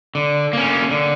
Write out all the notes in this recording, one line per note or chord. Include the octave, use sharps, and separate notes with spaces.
D3
A#3 C#4
D3